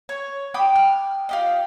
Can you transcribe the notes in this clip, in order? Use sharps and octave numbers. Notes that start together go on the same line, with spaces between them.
C#5
G5 B5 D6 D#6
F6
F4 G4 D#5